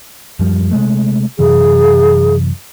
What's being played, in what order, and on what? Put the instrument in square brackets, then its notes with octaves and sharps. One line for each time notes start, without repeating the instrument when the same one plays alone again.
[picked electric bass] F#2 F3 G3
C3 G#3 A3
[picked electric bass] F#2 C3 E3 [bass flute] G#4